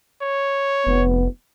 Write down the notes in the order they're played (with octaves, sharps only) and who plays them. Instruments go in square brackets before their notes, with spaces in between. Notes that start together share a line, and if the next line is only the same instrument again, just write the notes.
[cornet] C#5
[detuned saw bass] F1 [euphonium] B3